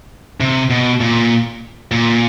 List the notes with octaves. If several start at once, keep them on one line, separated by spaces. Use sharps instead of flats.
C3
B2
A#2
A#2